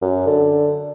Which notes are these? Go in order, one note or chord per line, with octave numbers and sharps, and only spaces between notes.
F#2
D3